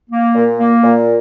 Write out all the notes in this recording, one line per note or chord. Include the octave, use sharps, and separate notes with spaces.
A#3
A#2
A#3
A#2